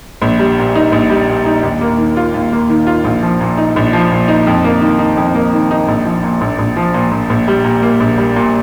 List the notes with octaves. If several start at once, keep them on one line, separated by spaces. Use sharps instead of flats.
A#1
G3
A#2
D#4
A#1
G3
A#2
D#4
D#2
A#3
D#3
F4
D#2
A#3
D#3
F4
A#1
F3
A#2
D#4
A#1
F3
A#2
D#4
F2
A#3
D#3
D#4
F2
A#3
D#3
D#4
A#1
F3
A#2
A#1
A#1
F3
A#2
A#1
A#1
G3
A#2
A#3
A#1
G3
A#2